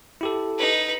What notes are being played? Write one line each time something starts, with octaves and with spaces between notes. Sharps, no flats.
E4 G4 A4
D#4 B4